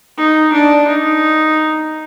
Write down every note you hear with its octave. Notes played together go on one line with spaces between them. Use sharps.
D#4
D4
D#4